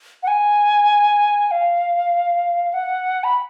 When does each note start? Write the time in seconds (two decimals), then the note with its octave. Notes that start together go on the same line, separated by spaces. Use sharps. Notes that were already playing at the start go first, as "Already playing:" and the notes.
0.23 F#5
0.27 G#5
1.51 F5
2.74 F#5
3.24 B5